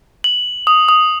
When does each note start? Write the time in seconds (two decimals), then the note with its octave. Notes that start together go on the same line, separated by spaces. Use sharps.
0.24 F#7
0.67 D#6
0.89 D#6